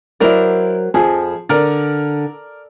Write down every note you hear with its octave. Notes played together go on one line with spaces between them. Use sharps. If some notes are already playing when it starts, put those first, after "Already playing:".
F#3 E4 A#4 C5 D5
F2 F3 G#4
D3 A#4 D5